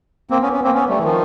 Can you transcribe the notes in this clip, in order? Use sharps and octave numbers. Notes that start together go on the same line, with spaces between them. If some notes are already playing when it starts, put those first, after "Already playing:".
A#3 C4
B3 C#4
B3 C#4
A#3 C4
B3 C#4
G3 A3
E3
D#3 F3